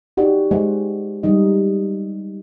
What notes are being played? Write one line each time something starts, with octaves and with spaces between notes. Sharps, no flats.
D#4 F#4 G4 D5
G#3 C5 F#5
G3 G#3 D#4 D#5